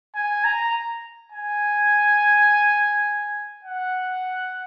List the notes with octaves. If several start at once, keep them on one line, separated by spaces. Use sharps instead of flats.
G#5
A#5
G#5
F#5